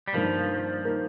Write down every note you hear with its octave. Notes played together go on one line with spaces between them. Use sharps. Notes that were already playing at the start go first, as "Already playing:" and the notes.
G3
G2 D#3 F3 A#3
D#3 A#3